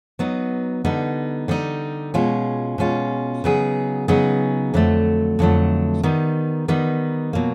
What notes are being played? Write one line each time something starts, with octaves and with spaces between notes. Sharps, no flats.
F#3 B3 D#4
D3 G3 B3 D#4
D3 G3 B3 D#4
B2 G#3 C#4 F4
B2 G#3 C#4 F4
C#3 F#3 B3 D#4 G#4
C#3 F#3 B3 D#4 G#4
F2 D3 F#3 A3
F2 D3 F#3 A3
D#3 G3 B3 D#4
D#3 G3 B3 D#4
B2 F#3 A#3